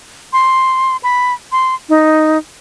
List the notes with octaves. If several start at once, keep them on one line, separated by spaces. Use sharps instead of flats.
C6
B5
C6
D#4